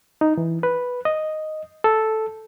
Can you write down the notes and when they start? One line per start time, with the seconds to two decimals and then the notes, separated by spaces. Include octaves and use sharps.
0.21 D#4
0.38 E3
0.63 B4
1.05 D#5
1.84 A4